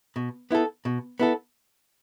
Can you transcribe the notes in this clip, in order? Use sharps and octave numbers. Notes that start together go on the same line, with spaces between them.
B2
B3 E4 A4
B2
B3 E4 A4